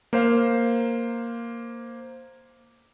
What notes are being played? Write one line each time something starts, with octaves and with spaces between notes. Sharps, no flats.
A#3 C5 F5